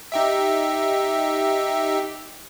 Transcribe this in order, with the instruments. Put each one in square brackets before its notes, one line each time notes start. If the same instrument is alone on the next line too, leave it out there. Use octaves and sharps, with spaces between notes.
[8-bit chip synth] D#4 G4 E5